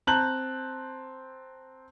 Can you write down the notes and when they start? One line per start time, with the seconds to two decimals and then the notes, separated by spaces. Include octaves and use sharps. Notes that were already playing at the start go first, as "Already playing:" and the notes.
0.07 C4 A5 A#5 F#6 G6 F#7